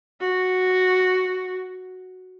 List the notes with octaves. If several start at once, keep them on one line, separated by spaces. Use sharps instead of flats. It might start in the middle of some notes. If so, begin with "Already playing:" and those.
F#4